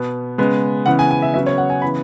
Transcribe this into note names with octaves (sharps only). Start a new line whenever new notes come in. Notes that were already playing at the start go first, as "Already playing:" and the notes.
Already playing: B2 B3
C#3 G#3 B3
C#3 E3 B3 F#5
G#5
G#5
E5
C#3 F#3 B3 E5
C#5
F#5
G#5
C#3 E3 B3 B5